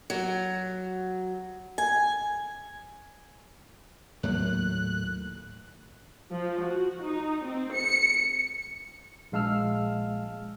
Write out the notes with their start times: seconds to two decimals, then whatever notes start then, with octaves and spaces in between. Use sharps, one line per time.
0.10 F#3
1.78 G#5
4.23 D#2 A2 F#3 A#3 F#6
6.31 F3
6.62 F#4
7.03 D#4
7.45 C4
7.74 C#7
9.32 A#1 G#3 F5 A5 E6 F6